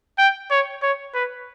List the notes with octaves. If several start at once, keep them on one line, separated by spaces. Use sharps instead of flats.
G5
C#5
C#5
B4